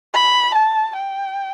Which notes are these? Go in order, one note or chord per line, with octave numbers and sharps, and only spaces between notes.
B5
A5
G5